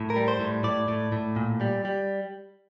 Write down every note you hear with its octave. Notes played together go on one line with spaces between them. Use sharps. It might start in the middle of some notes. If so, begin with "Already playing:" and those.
Already playing: A2
A#4
G3
C5
A2
A2 D5
A2
A2
A#2
G3
G3